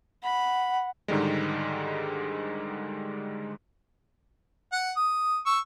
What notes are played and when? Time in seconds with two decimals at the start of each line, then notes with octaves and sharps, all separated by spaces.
0.23 F#5 B5
1.08 G#2 D3 D#3 G3 G#3
4.72 F#5
4.97 D#6
5.46 C#6 E6